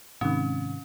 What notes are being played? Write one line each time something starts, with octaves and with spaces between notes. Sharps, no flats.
G#2 C3 D#3 C#4